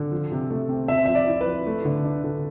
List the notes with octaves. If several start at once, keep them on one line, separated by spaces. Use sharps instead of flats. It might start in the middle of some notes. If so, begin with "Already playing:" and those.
Already playing: D3
F3
C3
A3
C4
C4 E5
F3 E5
D5
E4
B4
F3
A3
D3
D4
D3